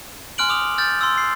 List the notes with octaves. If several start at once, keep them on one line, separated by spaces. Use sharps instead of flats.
G#5 C6 F6 F#6 D7 F#7
D6 D#6 F7
F6 G6 A6
C6 E6
C7